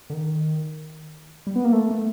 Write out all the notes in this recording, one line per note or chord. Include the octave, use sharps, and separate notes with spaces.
D3
D#3
G3
B3
A#3
A3
A3